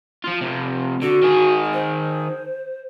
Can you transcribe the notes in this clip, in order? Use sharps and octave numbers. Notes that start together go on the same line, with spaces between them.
F3 F4
F2 C3
D3 F#4
D#3 G#4
C5